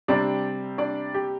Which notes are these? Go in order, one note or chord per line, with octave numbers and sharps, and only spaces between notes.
C3 G3 C4 D4 D5
D4 D5
G4